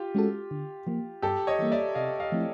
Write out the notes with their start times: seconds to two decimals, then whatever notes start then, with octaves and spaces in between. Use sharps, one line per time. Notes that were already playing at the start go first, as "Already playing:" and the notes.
Already playing: F4 G4
0.15 G#3 C#4 F#4 A4
0.51 D3
0.87 F3 A#3
1.22 G2 G4 A4
1.47 C#5 D#5
1.59 E3 G3 A#3
1.72 D5 E5
1.95 C3 D#5 F5
2.20 D#5 F5
2.32 F3 A3 C4 E4